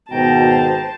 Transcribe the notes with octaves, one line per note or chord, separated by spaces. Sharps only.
G#1 B2 C5 G5 A5 A#5